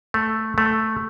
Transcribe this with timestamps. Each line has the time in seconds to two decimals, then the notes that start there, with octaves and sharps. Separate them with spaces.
0.14 A3
0.58 A3